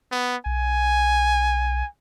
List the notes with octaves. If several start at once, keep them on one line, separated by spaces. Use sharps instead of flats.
B3
B1 G#5